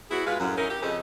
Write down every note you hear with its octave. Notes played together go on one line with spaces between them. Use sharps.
B3 E4 F#4 G#4
B2 G#3 F4 B4 F5
F#2 A2 F#3
C#4 D#4 E4 A#4
G4
F2 C#3 G#4 A4 C5 D#5